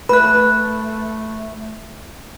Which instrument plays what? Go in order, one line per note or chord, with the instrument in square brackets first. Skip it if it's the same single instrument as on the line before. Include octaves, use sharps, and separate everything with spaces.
[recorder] A3 [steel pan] B4 [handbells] B5 F#6